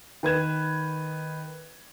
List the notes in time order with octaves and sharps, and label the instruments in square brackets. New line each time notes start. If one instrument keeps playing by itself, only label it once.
[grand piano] D#3 B4 G#6 E7